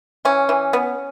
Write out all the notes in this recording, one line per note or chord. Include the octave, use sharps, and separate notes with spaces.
E3 C#4
E3
B3